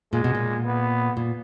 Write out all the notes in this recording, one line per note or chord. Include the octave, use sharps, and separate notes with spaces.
A#2 G#3
B2
A#2
B3
A#2